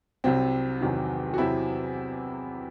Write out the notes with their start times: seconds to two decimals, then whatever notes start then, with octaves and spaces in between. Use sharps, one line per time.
0.24 C2 C3 F#3 C4
0.81 E2 C3 D#3 F#3
1.34 F#4
1.38 E2 C3 F#3 C4 E4